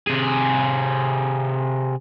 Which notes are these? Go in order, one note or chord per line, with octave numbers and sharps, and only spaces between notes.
C3 G#4